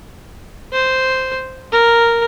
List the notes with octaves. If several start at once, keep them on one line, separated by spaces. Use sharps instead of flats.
C5
A#4